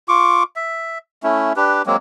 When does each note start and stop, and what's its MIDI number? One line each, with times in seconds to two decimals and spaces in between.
0.08 0.43 65
0.08 0.43 85
0.08 0.43 86
0.56 0.98 76
1.23 1.53 57
1.23 1.53 61
1.23 1.53 64
1.56 1.82 62
1.56 1.82 67
1.56 1.82 71
1.86 1.97 54
1.86 1.97 56
1.86 1.97 58
1.86 1.97 60